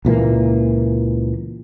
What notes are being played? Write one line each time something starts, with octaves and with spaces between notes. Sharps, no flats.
C#2 A#2 E3 A#3